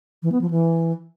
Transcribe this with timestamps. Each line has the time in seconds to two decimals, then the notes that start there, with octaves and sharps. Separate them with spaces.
0.23 E3
0.32 B3
0.41 F3
0.50 E3